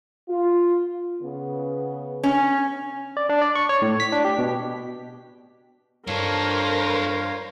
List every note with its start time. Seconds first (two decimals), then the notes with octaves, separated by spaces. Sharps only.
0.29 F4
1.22 C#3 B3
2.23 C#4
3.17 D5
3.29 D4
3.42 D5
3.55 C#6
3.69 C#5
3.82 A2
4.00 B6
4.12 D4
4.25 G4
4.39 B2
6.07 G2 D4 F4 A4 A#4 C5 C#5 F5